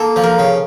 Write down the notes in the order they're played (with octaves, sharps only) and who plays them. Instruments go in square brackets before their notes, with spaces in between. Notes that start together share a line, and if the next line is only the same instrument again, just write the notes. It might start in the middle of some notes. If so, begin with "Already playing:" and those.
Already playing: [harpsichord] A#3 [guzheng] A4
[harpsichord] F3
[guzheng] A#4
[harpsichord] C#3